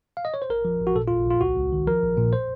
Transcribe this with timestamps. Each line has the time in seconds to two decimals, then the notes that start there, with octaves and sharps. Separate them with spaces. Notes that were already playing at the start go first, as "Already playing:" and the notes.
0.17 F5
0.25 D#5
0.34 C#5
0.42 C5
0.50 A1 A#4
0.65 F3
0.81 A1
0.87 F#4
0.95 A#2 A4
1.08 F4
1.11 A#1
1.26 A#1 F4
1.41 C#2 F#4
1.56 C#2
1.72 D#3
1.87 F3 A#4
2.03 A#1
2.17 A#2
2.33 C5